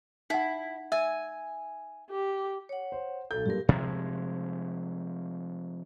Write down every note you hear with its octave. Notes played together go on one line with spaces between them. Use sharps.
D#4 E4 F#5
E5 G#5 E6
G4
C#5 F#5
C5
B1 A4 G6
G2 A#2 G4 A#4
C3 F3 G#3